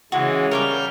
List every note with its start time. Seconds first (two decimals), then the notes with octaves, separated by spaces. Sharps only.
0.12 C#3 E3 G#3 F#4
0.51 G3 A#4 C#5 D6 F6 G6